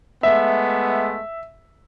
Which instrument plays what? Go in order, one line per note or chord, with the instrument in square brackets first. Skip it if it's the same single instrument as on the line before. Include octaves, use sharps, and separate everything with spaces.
[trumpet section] G#3 A3 B3 [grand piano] E5